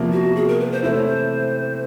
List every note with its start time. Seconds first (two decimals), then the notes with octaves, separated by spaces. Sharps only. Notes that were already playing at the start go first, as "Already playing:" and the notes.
Already playing: E2 C3 F3 A#3
0.12 F#4
0.36 G#4
0.48 A#4
0.60 B4
0.72 C5
0.83 C3 E3 A3 C4 E4 C5
0.94 C#5
1.06 C5